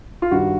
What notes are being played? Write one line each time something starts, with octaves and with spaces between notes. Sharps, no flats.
F4
G2 D#3 G3 F#4